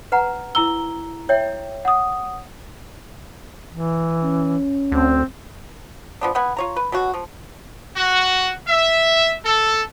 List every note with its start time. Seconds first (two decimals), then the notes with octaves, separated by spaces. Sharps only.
0.12 B4 F#5 A#5
0.55 E4 A#5 E6 G7
1.29 C#5 E5 G5
1.85 F#5 D#6
3.70 E3
4.24 C#4
4.92 D2 C4
6.21 F3 B3 D4
6.35 B3 B4 F#5 G#5
6.57 F4 C#5 A#5
6.76 B4
6.92 B2 F#3 F#4
7.14 F3
7.97 F#4
8.68 E5
9.46 A4